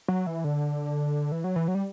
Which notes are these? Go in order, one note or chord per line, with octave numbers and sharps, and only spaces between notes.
F#3
E3
D3
E3
F#3
E3
F#3
G3